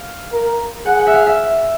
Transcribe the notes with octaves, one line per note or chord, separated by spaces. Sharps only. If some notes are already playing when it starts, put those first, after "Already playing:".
Already playing: F5
A#4
G#4 F#5
F#5
E5
F5
E5